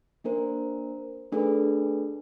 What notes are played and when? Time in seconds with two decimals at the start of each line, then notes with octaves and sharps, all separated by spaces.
0.24 A#3 D4 A#4 C5
1.32 A3 D4 G#4 A4 B4